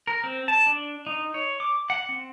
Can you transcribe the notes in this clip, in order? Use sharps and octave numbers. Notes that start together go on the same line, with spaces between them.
A#4
C4
A5
D4
D#4
C#5
D6
F#5
C4